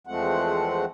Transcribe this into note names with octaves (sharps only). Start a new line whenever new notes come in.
E2 F3 G#3 A3 C4 F#5